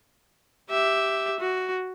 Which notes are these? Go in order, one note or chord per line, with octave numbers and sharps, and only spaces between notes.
G4 E5
F#4